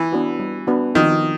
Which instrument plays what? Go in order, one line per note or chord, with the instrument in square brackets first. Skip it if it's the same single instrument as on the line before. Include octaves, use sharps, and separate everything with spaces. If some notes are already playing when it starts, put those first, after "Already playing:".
Already playing: [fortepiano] E3
[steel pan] B3 D4 F#4 B4
G3
B3 D4 F#4 B4
[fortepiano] D#3 [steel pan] F3